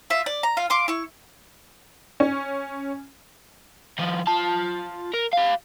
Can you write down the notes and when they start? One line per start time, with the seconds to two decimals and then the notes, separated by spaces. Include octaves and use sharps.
0.10 F4 E5
0.26 D5
0.43 A#5
0.57 F4 F5
0.70 F5 C6 D6
0.88 E4 C#6
2.20 C#4
3.99 D#3 F3
4.27 F4 A5
5.13 A#4
5.33 G4 F5